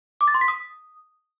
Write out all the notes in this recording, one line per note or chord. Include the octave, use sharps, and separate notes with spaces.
D6
A6
C6
B6
D#6